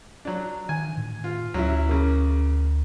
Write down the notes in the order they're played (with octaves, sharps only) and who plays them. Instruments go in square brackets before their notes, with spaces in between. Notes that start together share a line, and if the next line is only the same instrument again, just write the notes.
[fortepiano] F#3 D4
[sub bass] D#3 [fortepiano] G#5
[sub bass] A2
[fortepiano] F4
[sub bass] D2 [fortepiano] F#3 C#4 E4
[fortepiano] C#3 A#3